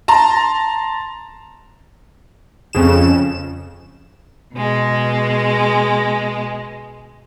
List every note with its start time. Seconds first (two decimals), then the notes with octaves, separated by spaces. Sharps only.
0.08 A5 A#5 C6
2.73 F2 C#3 E7
4.55 B2 G#3